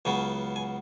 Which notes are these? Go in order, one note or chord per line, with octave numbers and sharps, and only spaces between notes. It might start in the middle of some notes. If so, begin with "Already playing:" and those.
C#2 C#3 F#3 B3 G#5
G#5